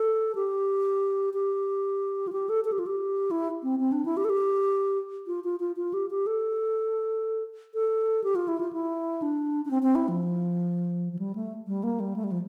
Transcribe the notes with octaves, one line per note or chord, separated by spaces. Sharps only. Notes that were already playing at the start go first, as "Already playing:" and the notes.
Already playing: A4
G4
G4
F4
G4
A4
A4
G4
F4
G4
E4
C4
C4
D4
E4
G4
A4
G4
F4
F4
F4
F4
G4
G4
A4
A4
G4
F4
E4
F4
E4
D4
D4
C4
C4
E4
F3
F3
G3
A3
G3
A#3
G3
A3
G3
F3